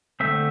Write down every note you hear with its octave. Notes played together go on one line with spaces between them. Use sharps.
D3 A3 C4 E5